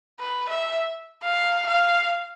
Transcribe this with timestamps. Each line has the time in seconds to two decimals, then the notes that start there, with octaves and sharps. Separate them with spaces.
0.19 B4
0.49 E5
1.22 F5
1.66 F5